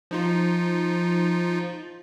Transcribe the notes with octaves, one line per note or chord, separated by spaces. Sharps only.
F3 D#4 F4